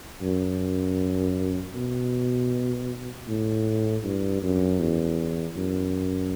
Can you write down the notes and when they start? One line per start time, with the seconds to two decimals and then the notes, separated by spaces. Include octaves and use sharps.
0.22 F#2
1.74 B2
3.28 A2
4.04 G2
4.42 F#2
4.80 E2
5.56 F#2